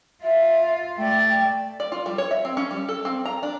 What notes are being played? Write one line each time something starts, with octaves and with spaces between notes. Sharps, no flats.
F4 E5
A3 D5 G5
D5
F4
G3
C#5
E5
C4
C#4
G3
A4
C4
A#5
D4